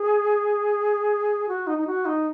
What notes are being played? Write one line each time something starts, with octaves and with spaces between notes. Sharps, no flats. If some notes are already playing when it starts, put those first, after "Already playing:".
Already playing: G#4
F#4
D#4
D#4
F#4
D#4